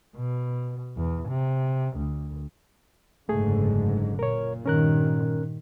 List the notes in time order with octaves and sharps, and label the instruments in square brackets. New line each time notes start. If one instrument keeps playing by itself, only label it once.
[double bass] B2
E2
C3
D2
[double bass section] F#1 G#2 D3 [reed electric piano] A3 G#4
[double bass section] A#2 [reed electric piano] A#4 C#5
[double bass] G2 D#3 [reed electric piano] C#4 A#4 F#6